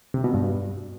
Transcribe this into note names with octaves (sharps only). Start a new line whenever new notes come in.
C3
B2
G2